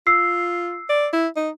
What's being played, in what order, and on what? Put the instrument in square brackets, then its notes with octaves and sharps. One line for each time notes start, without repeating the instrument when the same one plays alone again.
[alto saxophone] F4 [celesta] E6 C7
[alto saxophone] D5
E4
D#4